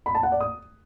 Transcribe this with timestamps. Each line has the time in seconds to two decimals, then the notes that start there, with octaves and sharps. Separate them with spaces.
0.06 B5
0.15 A5
0.23 F#5
0.32 D5
0.40 D#6